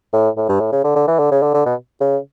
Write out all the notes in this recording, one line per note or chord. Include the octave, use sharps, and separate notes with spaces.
A2
A2
G2
A2
C#3
D3
D3
E3
D3
C#3
D3
D3
B2
C#3